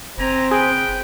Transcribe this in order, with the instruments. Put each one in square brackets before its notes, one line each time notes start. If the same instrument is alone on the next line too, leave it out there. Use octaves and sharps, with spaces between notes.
[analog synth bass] F#1 [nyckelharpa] C4 [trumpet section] G4 G#5 A#5
[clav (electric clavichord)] G#4 [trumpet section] B4 G5